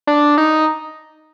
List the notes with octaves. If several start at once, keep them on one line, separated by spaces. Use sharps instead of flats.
D4
D#4